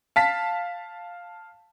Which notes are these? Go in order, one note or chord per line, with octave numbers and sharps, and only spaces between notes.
F5 A5 B6